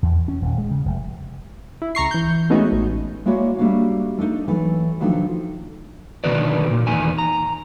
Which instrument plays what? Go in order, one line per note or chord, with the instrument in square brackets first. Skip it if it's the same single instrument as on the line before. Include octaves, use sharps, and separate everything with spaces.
[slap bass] E2
C#4
D#1
G#3
C#3
F1
[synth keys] E4
C#2 A#5 C#6 C7
E3 G6
G#3 A3 B3 C#4 D#4 F#4
A1
[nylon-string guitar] G#3 A#3 E4 F#4 C#5 D5
G3 A3 A#3 D4 F#4 F5
A3 D4 D#4 A#4
E3 F#3 A3
C3 D#3 F3 F#3 A3 D4
[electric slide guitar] B2 D3 D#3 F#4 B4 D5
A#2
E2 D#3 G#5
A#5